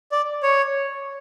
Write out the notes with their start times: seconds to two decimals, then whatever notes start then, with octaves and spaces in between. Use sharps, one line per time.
0.12 D5
0.43 C#5